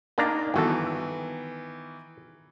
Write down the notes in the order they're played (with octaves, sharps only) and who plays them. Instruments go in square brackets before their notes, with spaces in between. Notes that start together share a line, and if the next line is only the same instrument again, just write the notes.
[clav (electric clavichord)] A#3 D4 A#5 [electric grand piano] D#4 D6
[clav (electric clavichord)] G1 F#4 A4 [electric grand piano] D#3 E3 B3